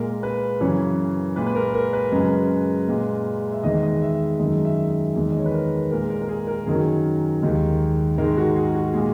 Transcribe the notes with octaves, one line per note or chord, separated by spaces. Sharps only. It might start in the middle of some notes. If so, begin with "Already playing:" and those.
Already playing: A#2 G#3 A#4
B4
F#2 C#3 E3 C#5
A#2 G#3 B4
B4
A#4
A#4
B4
F#2 C#3 G#3
A#2 G#3
E5
E2 D#3 G#3 D#5
D#5
E5
F#2 D#3 G#3 D#5
E5
D#5
E2 D#3 G#3
D#5
C#5
B4
A#4
A#2 G#3 A#4
A#4
A#4
G#4
A#4
F#2 D#3 F#3 G#4
D#2 D#3 G#3
G#2 D#3 G#3 A#4
F#4
G#4
F#4
A#2 G#3 G#4